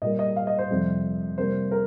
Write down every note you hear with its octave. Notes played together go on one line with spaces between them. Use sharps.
A#2 G3 A#3 D#5
D#5
F5
D#5
C5
F2 C3 G3
C3 G3 A#3 C5
A#4